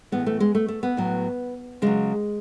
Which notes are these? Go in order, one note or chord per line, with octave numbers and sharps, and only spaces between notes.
A2 E3 G#3 B3
A3
G#3
A3
A3
B3
A2 F#3
C#3 F#3 G#3